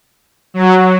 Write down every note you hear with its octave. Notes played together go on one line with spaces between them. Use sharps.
F#3